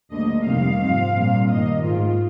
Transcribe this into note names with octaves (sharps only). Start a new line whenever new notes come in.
D2 D3 G3 A#3 D#5
F2 C3 D#3 G3 C4 F5
G#2 F3 C4
A#2 G3 C4
G2 D#3 A#3 D#5
G#2 D#3 G#3 F4